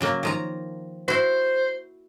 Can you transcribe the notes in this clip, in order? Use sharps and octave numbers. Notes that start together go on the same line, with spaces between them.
C#3 F#3 A#3
D#3 F3 A#5
E4 F#4 C5